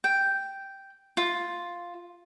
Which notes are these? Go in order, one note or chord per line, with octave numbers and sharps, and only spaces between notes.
G5
F4